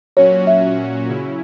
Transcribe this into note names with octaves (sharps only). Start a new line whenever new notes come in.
A#2 F#3 C#4 F#4 C#5
E5
C#3 F#3 C#4 E4